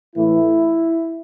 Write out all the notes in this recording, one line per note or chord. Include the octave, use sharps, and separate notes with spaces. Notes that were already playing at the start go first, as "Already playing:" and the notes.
A2 E3 A3 E4